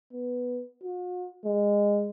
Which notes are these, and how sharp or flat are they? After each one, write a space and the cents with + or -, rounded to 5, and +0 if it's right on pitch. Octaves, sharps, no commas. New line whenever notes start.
B3 +0
F#4 -45
G#3 -20